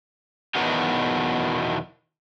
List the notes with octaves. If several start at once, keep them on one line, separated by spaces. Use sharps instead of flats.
E2 B2 D#3 F#3 D4 D#4